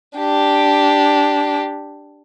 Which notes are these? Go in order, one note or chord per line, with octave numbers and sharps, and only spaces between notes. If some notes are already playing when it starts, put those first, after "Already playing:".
D4 G4